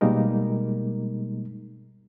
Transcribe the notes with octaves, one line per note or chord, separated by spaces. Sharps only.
B2 G3 G#3 A#3 D#4 A#4